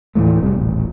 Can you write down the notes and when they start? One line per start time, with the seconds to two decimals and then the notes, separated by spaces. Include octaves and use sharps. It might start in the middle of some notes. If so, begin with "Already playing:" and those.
0.15 D#2 A2 E3 A3
0.40 F1 C3 G3
0.53 D#1 A1